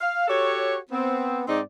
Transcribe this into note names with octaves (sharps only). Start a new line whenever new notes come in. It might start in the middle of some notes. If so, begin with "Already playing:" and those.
F5
F#4 G4 A4 C#5
B3 C4
G#2 C4 D#4 D5